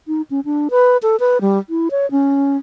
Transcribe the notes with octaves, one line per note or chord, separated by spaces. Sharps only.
D#4
C#4
D4
B4
A4
B4
G3
E4
C#5
C#4